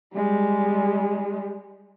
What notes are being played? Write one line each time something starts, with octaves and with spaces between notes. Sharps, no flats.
G3 G#3